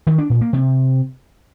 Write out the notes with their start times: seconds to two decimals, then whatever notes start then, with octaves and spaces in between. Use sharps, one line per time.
0.07 D#3
0.18 D4
0.30 A#2
0.41 A#3
0.53 C3